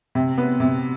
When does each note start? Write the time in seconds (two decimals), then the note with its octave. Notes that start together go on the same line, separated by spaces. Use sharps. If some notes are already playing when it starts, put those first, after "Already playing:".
0.15 C3
0.38 B3
0.60 C3